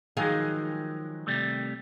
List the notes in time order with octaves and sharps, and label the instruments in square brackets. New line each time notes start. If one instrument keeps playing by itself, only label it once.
[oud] D#3 G#4 F5 [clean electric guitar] F3 F#3 G#3
[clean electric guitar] C3 G3 A3